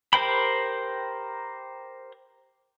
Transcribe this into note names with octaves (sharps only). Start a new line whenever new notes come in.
G4 A#4 C5 G5 B5